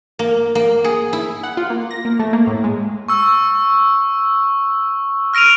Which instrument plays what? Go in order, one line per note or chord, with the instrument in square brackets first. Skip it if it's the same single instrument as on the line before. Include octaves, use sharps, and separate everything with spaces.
[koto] A#3
A#3
G#4
E4
[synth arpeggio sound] F#5
F4
A#3
A#6
A#3
A3
A#3
A2
G#3
[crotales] C#6 E6
F6 A#6 D7 D#7 F7